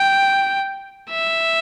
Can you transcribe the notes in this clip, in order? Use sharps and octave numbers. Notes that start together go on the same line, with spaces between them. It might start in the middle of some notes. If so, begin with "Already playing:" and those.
Already playing: G5
E5